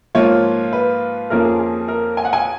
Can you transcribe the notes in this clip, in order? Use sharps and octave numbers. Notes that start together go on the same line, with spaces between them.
G#2 F3 A#3 F4 C#5
B4
F2 F3 A#3 C#4 F4 A#4
G#4
G#4
A#4
G#5
F#5
G#5